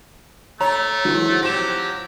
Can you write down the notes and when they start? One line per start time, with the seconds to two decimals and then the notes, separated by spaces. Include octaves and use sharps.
0.61 A3 C#5 A#5
1.05 G#2 E3 F#3
1.43 F3 F#3 C4 G4 A#6 E7